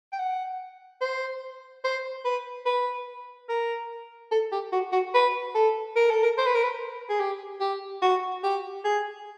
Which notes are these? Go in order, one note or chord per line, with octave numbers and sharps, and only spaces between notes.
G5
F#5
C5
C5
B4
B4
A#4
A4
G4
F#4
F#4
B4
A4
A#4
A4
A#4
C5
B4
A#4
B4
G#4
G4
G4
F#4
G4
G#4